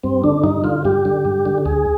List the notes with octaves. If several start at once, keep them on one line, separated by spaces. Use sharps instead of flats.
G2 C4
D3 D4
G2 D#4
D3 F4
G2 G4
D3
G2
D3
D2 G#4